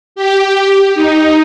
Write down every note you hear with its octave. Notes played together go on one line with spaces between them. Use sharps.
G4
D#4